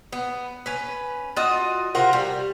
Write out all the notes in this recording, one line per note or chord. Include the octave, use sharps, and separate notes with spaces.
B3
C#4 B4
F4 F#4 D#5
C3 F4 F#4 A#4
G3